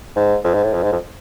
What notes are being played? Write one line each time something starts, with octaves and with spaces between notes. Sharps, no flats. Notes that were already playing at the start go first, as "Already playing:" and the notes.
G#2
F2
G#2
A2
F2
G#2
F2